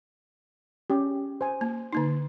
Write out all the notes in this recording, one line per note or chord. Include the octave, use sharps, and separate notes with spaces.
C#4 G4
C5 G#5
A#3
D3 A#3 D#4